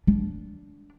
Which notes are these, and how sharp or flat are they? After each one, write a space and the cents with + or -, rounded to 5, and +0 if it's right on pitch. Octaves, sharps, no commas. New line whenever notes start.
D4 -15